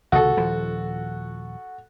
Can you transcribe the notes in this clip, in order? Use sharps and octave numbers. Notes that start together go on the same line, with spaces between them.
C#2 C3 D#3 F#4 A4
D#1 F3